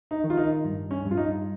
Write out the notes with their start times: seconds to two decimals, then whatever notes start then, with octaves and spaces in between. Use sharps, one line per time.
0.11 D#4
0.24 D#3
0.30 F4
0.37 D#4
0.64 G2
0.91 C#4
1.05 G2
1.11 F4
1.17 D#4